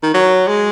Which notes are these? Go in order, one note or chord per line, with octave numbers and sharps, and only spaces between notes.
D#3
F#3
G#3